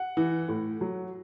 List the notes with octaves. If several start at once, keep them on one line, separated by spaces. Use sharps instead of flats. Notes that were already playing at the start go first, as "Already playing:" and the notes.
Already playing: F#5
E3
A2
F#3